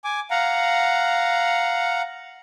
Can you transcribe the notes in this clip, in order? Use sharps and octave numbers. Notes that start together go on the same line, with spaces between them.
G#5 D6
F5 F#5 A#5